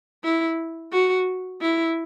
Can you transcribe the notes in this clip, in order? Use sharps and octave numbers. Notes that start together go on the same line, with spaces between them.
E4
F#4
E4